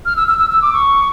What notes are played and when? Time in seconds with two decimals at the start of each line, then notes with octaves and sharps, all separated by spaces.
0.06 F6
0.16 E6
0.28 E6
0.38 E6
0.50 E6
0.62 D6
0.73 C#6